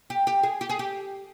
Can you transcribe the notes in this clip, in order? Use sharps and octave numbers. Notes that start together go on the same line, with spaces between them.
G4
G4
G#4
G4
G#4
G4